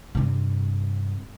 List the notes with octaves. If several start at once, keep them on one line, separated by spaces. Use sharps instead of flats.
G2 C3